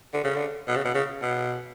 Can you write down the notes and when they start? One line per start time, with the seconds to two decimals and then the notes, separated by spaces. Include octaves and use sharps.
0.14 D3
0.24 C#3
0.36 D3
0.68 B2
0.76 C#3
0.85 B2
0.95 C#3
1.22 B2